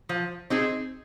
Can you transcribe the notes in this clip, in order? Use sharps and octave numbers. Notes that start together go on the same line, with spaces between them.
F3
C4 D#4 G#4